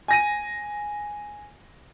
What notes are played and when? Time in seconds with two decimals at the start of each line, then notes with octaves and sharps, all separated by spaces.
0.08 G#5 A#6 D#7